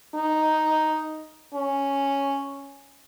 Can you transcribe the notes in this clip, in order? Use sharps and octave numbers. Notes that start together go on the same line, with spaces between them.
D#4
C#4